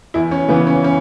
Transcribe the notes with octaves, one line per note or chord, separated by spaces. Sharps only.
E2 E4
C#4
C#3 E3 B3
C#4
C#4